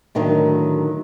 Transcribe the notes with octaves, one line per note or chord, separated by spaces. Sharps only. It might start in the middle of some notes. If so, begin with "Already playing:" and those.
A2 D3 D#3 F#3